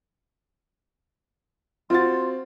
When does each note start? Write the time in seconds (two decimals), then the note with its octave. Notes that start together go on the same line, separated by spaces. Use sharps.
1.90 C4 F4 F#4 C6 A6